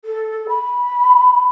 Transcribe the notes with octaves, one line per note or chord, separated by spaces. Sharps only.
A4
B5